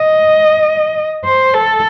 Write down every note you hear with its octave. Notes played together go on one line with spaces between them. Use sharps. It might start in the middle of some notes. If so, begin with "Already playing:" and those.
Already playing: D#5
C5
A4